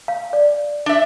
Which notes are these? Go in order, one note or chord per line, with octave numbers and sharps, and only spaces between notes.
F5
D5
D4 E5